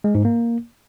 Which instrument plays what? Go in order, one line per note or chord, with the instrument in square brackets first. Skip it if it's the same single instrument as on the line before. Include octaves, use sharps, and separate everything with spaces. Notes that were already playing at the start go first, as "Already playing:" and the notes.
[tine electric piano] G#3
G#2
A#3